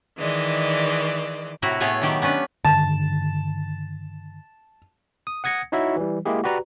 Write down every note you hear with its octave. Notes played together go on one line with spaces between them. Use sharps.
D#3 E3 G#3 D5
A2 C3 E4 F#4 A#5
A2 A3 B3 G#4 C#5
B2 D#3 F#3 G4
B3 C#4 D4 B4
G2 D3 D#3 A5
D#6
F#5 D#6 G#6 A#6 C#7
D#4 E4 F#4 C#5 E5
E3 G3
G#3 A#3 E4 G4 G#4
F#4 G4 B4 D5 A#5